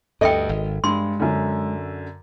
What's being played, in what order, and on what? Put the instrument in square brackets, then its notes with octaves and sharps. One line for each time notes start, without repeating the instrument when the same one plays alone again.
[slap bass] D2 G2 [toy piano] A4 E5 G5 [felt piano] D#5
[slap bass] G#1
[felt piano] G2 [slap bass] G#3 [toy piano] C6
[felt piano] F#2 D3